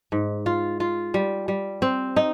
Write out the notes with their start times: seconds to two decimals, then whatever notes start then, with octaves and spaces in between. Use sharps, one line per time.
0.12 G#2
0.46 F4
0.80 F4
1.14 G3
1.48 G3
1.82 C4
2.16 D#4